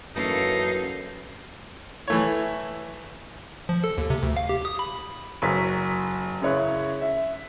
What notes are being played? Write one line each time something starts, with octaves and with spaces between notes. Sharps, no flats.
F#2 E3 A#3 C#4 D#4 A4 F5
E3 A3 C#5
F3
A4
D#2
C3
D2
F5
G4
D#6
B5
F#1 F#3 B6
F#2 C#3 E4 C#5 F#6
E5